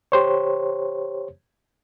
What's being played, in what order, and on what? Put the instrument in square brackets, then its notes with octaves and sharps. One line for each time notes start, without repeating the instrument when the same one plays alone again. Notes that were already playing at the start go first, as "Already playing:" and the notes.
[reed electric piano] G4 C5 C#5